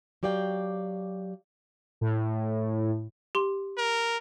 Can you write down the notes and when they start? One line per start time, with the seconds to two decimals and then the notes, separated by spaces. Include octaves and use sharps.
0.23 F#3 G4 D5 F5 G5
2.01 A2
3.35 G4 C6
3.78 A#4